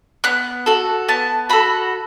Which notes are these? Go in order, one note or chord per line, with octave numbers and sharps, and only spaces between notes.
B3 F#6
F#4 A4
B3 A5
F#4 A4 B5